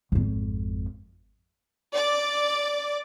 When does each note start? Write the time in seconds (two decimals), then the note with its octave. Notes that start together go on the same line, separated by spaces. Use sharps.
0.12 G#1 F2
1.94 D5